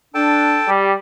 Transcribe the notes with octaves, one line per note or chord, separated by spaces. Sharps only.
D4 A4 G5 A5
G3 G4